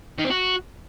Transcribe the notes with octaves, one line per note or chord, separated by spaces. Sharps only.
D#3
C4
F#4